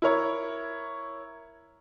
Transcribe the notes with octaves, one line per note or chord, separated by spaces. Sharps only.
E4 A#4 C#5